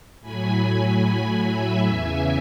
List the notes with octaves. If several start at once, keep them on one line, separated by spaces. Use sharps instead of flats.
A2 F#3 G#5 B5
G#5 B5
E5 G#5
E2 C#3 E3